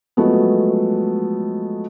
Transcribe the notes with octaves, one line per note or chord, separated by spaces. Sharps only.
F3 F#3 G#3 A3 B3